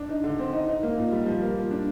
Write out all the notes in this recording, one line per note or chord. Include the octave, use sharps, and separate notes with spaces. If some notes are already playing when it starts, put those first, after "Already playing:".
Already playing: D4
D#4
D3
C4
D#4
D#4
A#3
A#2
G3
F3
A#3
F3
D4